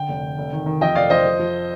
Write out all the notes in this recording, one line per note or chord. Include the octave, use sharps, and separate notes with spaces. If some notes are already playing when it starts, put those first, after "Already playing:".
Already playing: D3 G5
F1
D3
F1
D#3
D#3
F2 D#5 G5
F1 D5 F5
F2 C5 D#5
F3
F3